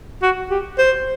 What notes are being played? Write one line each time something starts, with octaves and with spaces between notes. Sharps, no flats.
F#4
G4
C5